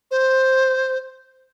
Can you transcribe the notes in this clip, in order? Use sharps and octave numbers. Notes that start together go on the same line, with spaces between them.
C5